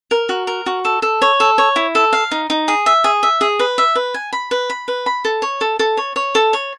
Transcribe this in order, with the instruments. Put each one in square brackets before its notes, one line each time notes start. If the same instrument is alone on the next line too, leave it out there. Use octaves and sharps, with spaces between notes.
[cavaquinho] A#4
F#4
A#4
F#4
A4
A4
C#5
A4
C#5
E4
A4
F5
D#4
D#4
G#4
E5
G#4
E5
G#4
B4
E5
B4
G#5
B5
B4
B5
B4
B5
A4
C#5
A4
A4
C#5
C#5
A4
C#5